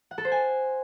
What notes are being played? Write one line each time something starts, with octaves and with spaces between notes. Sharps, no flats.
F#5
A4
C5
G#5